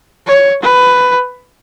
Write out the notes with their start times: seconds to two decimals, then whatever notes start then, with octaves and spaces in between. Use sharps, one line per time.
0.27 C#5
0.63 B4